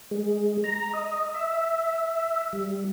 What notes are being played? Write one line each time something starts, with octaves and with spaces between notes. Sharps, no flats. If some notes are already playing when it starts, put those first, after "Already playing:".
G#3
A#5
D#5
E5
G3